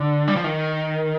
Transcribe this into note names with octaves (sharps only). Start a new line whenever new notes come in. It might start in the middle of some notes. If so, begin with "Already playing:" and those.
Already playing: D3
G3
F3
D#3